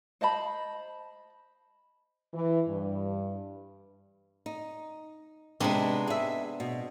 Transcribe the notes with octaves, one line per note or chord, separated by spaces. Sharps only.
C5 D#5 A5 B5
E3
G2
D#4
C3 G#3 B3 C4 D4 D#4
G#4 E5
B2